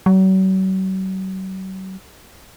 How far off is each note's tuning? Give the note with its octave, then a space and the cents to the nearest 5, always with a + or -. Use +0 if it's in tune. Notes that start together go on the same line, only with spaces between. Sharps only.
F#3 +40